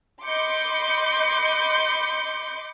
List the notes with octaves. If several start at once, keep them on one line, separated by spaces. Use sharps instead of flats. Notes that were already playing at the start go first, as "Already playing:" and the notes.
D#5 B5 C6 D6 G6 C#7